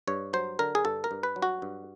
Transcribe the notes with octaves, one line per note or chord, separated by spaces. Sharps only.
G2 C#5
F#3 C5
D3 A#4
G#4
G2 A4
A#4
G2
B4
F#3
F#4
G2